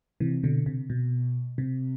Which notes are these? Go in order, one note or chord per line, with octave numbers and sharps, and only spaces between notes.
C3 E3
B2 D3
C3
B2
C3